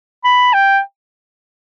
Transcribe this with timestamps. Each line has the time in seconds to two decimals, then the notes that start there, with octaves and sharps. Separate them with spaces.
0.24 B5
0.53 G5